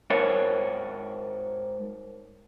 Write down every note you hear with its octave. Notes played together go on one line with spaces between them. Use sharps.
G#2 A#4 C#5